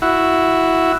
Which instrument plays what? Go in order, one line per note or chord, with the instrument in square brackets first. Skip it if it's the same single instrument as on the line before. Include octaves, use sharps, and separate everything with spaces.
[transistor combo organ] E4 F#4